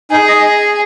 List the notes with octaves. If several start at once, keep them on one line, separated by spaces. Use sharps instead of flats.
D#4 G#4
D#5